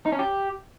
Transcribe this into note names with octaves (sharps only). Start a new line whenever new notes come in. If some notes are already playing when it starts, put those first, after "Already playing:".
D#4
C#4
G4